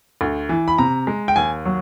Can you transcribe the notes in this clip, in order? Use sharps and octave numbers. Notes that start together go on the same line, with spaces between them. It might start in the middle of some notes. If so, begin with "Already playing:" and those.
D2
E3
B5
C3 A#5
G#3
G5
D#2 G#5
F#3